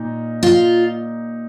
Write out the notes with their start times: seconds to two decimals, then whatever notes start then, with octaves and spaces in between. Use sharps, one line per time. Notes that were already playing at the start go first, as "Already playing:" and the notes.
Already playing: A#2 D#4
0.43 F4